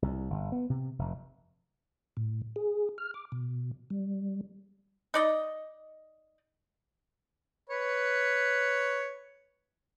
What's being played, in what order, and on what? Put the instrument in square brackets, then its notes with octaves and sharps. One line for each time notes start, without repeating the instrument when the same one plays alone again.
[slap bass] C2
G1
B3
C3
F1
[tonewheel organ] A2
G#4
F6
D6
B2
G3
[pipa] D#4 D5 D#5
[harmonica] B4 C#5